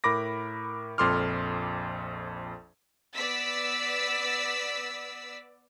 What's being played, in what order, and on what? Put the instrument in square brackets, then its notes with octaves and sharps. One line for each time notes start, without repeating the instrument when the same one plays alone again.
[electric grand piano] A2 A#4 B5 D6 A#6
A#1 F2 A4 C6 D6 F6
[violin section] B3 D5 E6 B6